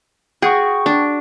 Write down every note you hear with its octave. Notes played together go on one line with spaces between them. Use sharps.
F#4 G#4 G5 C#6
D4